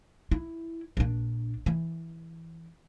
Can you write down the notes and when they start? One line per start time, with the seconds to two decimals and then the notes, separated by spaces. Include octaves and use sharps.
0.31 E4
0.97 A#1 D4
1.66 E3